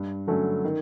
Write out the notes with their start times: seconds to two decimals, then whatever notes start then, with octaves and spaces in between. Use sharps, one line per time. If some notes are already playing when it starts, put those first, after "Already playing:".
Already playing: G2
0.27 D3 F#3 A3 C#4
0.64 D#3